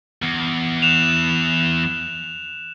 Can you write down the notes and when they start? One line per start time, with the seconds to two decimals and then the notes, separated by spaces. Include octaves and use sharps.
0.22 E2
0.82 F#6 E7 F7